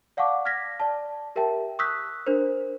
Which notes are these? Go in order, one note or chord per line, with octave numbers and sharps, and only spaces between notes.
D5 F5 F#5 A5 C#6 D6
F6 G#6 A#6 B6
D5 A5
G4 A#4 E5 G5 A5
C#6 D#6 E6 F#6 G6 B6
D4 A#4 C5